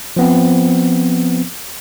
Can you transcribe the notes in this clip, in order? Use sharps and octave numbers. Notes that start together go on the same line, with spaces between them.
F3 B3 C4